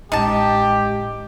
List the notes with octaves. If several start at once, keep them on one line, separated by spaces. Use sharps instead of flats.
A1 G#3 D#4 G4 A5